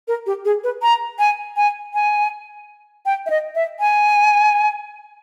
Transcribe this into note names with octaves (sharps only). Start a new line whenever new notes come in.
A#4
G4
G#4
B4
A#5
G#5
G#5
G#5
G5
E5
D#5
E5
G#5